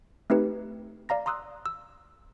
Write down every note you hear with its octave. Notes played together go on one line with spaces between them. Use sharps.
A3 C4 D#4 G4 B4
D5 F5 A#5 A#6
A#5 C6 D#6 E6 F#6
E6